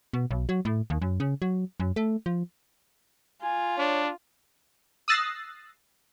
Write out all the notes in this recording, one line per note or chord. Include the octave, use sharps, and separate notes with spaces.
B2
B1
F#3
A2
D#2
F#2
C#3
F#3
F#2
A3
F3
F4 G#5
D4 C#5
D#6 E6 F#6 A6 A#6 C7